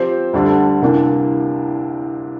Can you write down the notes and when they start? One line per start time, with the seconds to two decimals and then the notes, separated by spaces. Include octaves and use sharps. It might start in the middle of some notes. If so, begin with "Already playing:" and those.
Already playing: F3 C4 G4 C5
0.33 D2 D3 G3 D4 A4
0.82 C2 C3 E3 A#3 D4